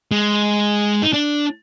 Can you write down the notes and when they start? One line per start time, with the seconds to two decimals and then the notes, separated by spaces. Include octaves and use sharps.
0.12 G#3
1.03 D#4
1.13 D4